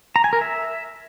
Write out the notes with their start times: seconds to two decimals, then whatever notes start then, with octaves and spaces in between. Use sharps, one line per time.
0.16 A#5
0.24 G#5
0.33 A#4
0.41 E5